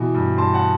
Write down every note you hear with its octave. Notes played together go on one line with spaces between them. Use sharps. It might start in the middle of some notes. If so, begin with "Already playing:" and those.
Already playing: B2 E3
G2
G2 A5 C6
F#5 A5